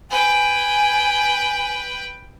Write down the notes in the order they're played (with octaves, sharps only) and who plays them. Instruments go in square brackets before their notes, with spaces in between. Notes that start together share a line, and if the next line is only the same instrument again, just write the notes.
[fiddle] B4 G5 [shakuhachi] G#5